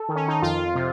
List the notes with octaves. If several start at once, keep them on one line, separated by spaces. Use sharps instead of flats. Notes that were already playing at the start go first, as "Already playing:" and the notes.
Already playing: A4
D#3
C#4
D#4
F2 F4
C3